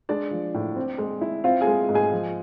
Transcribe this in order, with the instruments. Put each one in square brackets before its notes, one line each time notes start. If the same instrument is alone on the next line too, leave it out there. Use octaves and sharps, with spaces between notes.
[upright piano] G#3 D4 D5
F3
A2
C4
G#3
E4
C4 F4 F5
G#4 G#5
G#3
G#2
G#4 G#5
F3